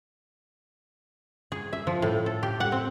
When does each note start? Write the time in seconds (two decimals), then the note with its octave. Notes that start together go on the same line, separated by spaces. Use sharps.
1.52 G#4
1.73 E5
1.87 F3
2.02 A2
2.26 A4
2.43 G4
2.60 F#5
2.72 C4